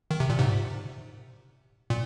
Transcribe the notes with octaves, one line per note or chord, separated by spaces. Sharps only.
D#3
C3
A#2
G#2 C3
A#2